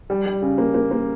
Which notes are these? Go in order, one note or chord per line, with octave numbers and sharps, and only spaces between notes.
G3
G3
C#3
A#3
A#3
A#3